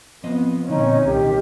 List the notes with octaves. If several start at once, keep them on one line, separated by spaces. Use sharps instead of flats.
F3 B3 C4 D#5
A#2 D3 C4 C#4 D#4
C2 D#3 G4